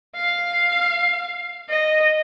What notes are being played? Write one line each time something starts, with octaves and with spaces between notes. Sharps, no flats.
F5
D#5